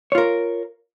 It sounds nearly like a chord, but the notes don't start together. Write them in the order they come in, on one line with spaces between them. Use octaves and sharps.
C#5 F4 A#4